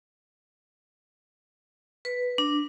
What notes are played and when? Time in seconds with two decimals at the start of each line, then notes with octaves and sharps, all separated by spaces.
2.05 B4
2.38 D4